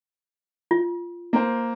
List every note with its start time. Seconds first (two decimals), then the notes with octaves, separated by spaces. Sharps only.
0.71 F4
1.33 A#3 C5